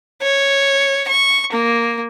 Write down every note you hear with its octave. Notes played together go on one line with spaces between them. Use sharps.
C#5
C#6
A#3